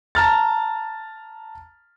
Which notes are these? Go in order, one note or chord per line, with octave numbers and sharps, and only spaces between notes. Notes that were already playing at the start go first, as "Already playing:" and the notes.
A5 A#5 F6 A6